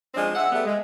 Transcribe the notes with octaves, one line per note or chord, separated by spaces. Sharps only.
F3 G#3 C4 D4
E5 F#5
G3 A3 B3
G#3